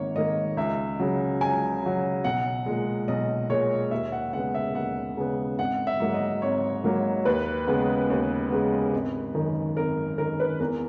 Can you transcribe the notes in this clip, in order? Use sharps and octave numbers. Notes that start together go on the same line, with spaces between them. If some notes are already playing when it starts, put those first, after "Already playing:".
Already playing: G#1 G#2 D#3 A#3 C#5
G#2 D#3 A#3 D#5
C#2 E5
C#3 F#3
C#2 G#5
C#3 F#3
B1 F#5
A#2 G#3
B1 D#5
A#2 G#3 C#5
D#2 E5
F#5
C#3 G#3 B3 F#5
E5
D#2 F#5
C#3 G#3 B3
G#1 F#5
E5
G#2 F#3 A#3
D#5
G#1 C#5
G#2 F#3 A#3
D#2 B4
C#3 G#3 B3
D#2
C#3 G#3 B3
G#1
F#2 D#3
G#1 A#4
F#2 D#3 A#4
B4
E2 A#4